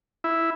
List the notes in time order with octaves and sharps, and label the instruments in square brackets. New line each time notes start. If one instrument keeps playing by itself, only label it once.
[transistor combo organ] E4